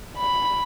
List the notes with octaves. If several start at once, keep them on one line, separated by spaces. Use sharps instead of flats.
B5